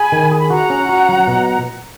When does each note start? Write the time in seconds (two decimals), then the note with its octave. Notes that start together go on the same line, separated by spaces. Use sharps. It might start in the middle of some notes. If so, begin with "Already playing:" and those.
Already playing: G#4 G#5 B5
0.12 D#3
0.32 G#4
0.38 B5
0.50 F#4 F#5 A#5
0.70 C#4
0.89 F#4
1.09 F#3
1.28 B2